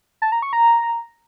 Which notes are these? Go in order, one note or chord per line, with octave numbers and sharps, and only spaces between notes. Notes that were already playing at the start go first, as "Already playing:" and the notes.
A5
A#5
C#6
A#5